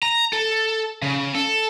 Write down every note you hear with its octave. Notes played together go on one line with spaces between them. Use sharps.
A#5
A4
C#3
A4